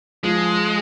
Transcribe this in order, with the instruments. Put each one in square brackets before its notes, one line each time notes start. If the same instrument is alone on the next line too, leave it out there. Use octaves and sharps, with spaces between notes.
[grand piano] F3 [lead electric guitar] G#3